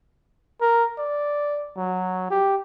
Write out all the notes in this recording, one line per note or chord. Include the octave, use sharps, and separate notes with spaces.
A#4
D5
F#3
G4